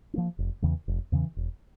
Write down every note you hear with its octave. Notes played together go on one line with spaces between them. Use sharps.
F3 A#3 C#4
F1
E2 C#3 E3
F1
E2 C#3 E3
E1